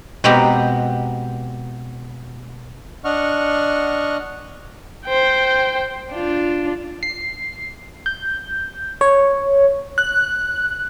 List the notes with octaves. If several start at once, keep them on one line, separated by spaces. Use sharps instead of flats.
B2 G#3 B3 C4 G4 A#5
D4 D#5 F#5 C#6 F6
C5 G5
D4 F4
C7
G6
C#5
F#6